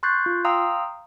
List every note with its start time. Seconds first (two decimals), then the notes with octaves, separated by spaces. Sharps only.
0.03 C6 C#6 F#6 G6 A6 C7
0.26 F4
0.45 F5 G5 A#5 C6 D#6 E6